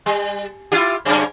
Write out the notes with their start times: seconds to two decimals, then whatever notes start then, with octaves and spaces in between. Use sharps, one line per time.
0.06 G3
0.72 E4 F4 G4
1.05 F#2 C#3 C#4